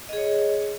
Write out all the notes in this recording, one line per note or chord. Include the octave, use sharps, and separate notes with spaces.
G#4 C#5 D#5